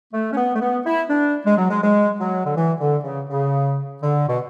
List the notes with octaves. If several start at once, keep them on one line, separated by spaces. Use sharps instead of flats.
A3
C#4
B3
A3
B3
E4
D4
G#3
F#3
G#3
G#3
F#3
D3
E3
D3
C#3
C#3
D3
B2